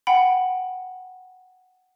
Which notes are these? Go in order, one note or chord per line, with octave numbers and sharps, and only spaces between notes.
F#5 G5 B5